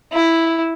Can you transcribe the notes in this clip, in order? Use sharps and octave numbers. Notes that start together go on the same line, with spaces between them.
E4